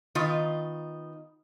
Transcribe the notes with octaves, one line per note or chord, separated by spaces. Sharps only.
D#3 B3 D#4 F4